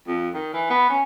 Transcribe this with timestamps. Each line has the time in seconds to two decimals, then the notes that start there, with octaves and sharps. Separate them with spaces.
0.07 F2
0.34 D#3
0.53 E3
0.70 B3
0.89 C#4